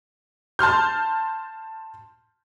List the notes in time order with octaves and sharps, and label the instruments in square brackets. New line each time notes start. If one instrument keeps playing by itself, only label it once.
[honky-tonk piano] A5 C6 F6 G6